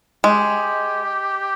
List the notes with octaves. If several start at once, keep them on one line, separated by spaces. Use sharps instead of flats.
G#3 G4